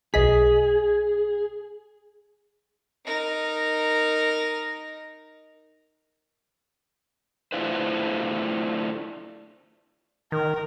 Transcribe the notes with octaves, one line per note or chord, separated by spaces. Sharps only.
B1 G#4 D#5 B6
D#4 A#4
A3 D4 E4 F4 B4 C5
D#3 A#4